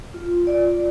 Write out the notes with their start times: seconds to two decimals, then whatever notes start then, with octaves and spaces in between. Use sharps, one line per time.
0.14 F4
0.47 D5